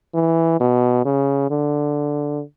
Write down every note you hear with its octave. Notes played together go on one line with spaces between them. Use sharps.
E3
B2
C#3
D3